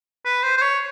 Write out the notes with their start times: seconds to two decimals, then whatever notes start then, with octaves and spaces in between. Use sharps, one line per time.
0.25 B4
0.43 C5
0.57 C5
0.62 C#5